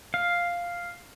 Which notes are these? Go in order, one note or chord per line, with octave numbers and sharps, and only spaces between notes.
F5